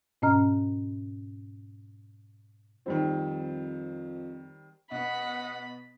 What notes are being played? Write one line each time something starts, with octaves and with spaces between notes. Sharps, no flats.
G#2 B2 C#4 D#5 A#5 F6
F2 D#3 G3 C4
B2 B3 D#5 F#5 B5